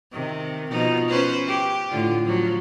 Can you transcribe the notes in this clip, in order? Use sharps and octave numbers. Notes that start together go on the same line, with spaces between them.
C3 D#3
B2 F3 D#4
C#4 B4 C5
G4
A2 D3 F4
F3 F#3